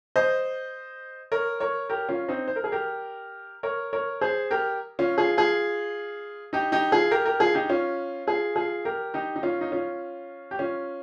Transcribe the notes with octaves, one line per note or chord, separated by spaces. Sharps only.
C5 D#5
A#4 C#5
A#4 C#5
G4 A#4
C#4 F4
C4 D#4
C5
A#4
G#4
G4 A#4
A#4 C#5
A#4 C#5
G#4 C5
G4 A#4
C#4 F4
F4 G#4
F4 G#4
D#4 G4
D#4 G4
F4 G#4
G4 A#4
G4 A#4
F4 G#4
D#4 G4
C#4 F4
F4 G#4
F4 G#4
G4 A#4
D#4 G4
D#4
C#4 F4
D#4
C#4 F4
G4
C#4 F4